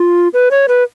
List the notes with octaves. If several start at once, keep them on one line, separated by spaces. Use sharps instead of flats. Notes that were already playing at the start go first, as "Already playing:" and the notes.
Already playing: F4
B4
C#5
B4